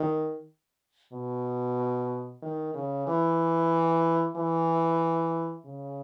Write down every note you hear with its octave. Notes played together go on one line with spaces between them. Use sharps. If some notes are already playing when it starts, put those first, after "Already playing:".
Already playing: D#3
B2
D#3
C#3
E3
E3
C#3